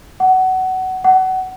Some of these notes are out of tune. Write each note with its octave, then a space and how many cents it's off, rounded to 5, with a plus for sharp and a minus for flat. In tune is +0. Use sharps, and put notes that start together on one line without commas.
F#5 +20
F#5 +25